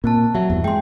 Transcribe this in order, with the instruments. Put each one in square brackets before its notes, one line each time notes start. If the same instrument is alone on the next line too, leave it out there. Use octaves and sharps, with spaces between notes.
[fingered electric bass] A#2 [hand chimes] A#3 C4 A5
[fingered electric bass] F#3 [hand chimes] E5
[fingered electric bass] E2 G2
[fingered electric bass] G#3 [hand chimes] G5 C6